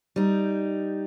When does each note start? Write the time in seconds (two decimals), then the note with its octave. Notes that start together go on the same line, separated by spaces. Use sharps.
0.16 G3 D#4